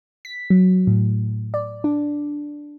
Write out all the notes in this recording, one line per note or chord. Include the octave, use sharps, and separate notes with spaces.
B6
F#3
A2
D5
D4